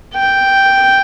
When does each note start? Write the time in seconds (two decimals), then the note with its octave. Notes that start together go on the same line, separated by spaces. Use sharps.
0.14 G5